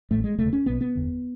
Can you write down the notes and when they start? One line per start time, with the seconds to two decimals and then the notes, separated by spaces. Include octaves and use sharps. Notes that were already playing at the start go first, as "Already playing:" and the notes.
0.11 A1 A2 A3
0.24 G#3
0.38 E1 D2 C#3 A3
0.53 C#4
0.66 B1 B2 B3
0.81 B3
0.95 F#1 E2 D3